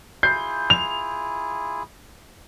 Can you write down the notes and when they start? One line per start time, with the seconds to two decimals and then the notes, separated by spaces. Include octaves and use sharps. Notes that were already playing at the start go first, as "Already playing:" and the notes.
0.23 E4 F4 G#4 G6 C7
0.70 F7